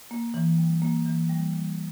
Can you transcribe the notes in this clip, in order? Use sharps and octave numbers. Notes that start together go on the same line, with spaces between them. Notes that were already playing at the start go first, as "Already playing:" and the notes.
A#3
E3
G3
A#3
E3
G3
G3